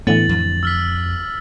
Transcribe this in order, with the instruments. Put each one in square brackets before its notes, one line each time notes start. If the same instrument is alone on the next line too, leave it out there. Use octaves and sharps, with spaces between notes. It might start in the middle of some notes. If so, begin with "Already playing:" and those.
[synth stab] A2 D3 E3 [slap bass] B3 [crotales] A6 F#7
[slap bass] F2
[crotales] E6 F6 B6